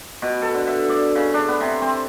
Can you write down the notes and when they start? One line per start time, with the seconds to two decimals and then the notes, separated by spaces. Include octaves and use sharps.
0.22 B2
0.42 A4
0.55 D3
0.67 E5
0.89 D5
1.15 C#3
1.34 D4
1.48 B3
1.60 C3
1.82 C4